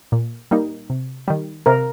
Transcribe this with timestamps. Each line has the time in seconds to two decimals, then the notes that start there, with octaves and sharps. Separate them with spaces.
0.12 A#2
0.51 G3 A#3 D#4
0.90 C3
1.28 D#3 G3
1.66 C3 A#4